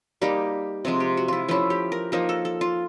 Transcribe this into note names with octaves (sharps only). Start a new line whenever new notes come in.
G3 A#3 D#4 G4
C3 F3 G#3
G4
F#4
E4 F4
F3 A3 C#4 E4 F4
G4
A#4
F3 A#3 D#4 A#4
A4
A4
F4